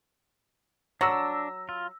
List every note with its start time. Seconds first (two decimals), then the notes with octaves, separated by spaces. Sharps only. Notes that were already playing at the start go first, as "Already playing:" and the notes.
1.01 F#3 D4 E6 A#6
1.69 F4